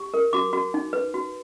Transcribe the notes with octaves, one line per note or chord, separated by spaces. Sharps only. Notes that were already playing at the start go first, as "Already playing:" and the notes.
Already playing: G4
A#4
F#4 D6
F#4
D#4
B4
F#4